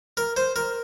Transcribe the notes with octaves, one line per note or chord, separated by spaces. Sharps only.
A#4
C5
A#4